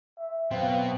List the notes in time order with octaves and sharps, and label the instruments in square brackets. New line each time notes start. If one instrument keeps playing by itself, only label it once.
[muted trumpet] E5
[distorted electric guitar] B2 [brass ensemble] F#3 B3 [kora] C4 [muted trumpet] F5